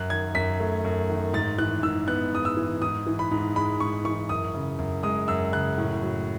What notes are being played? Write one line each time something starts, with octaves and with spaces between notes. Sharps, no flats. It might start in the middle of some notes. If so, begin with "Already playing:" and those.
Already playing: F#2 F#6
D#3 G#6
F#2 B6
A3
F#2
D#3
G#2 A6
E3 F#6
G#2 E6
B3 F#6
G#2 D#6
E6
E3
G#2 D#6
E3
B5
G#2
G#3 B5
G#2 C#6
E3 C#6
F#2 D#6
C#3
F#2
G#3 D#6
F#2 E6
C#3 F#6
A2
F#3